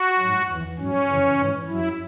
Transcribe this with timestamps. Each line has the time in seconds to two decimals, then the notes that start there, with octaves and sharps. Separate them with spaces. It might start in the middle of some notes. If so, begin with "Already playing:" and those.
Already playing: F#4
0.19 G#2 F#3
0.49 E2 E3
0.78 G#2 F#3 C#4
1.08 F#2 C#3 E3
1.38 G#2 E3
1.68 F#2 F#3 E4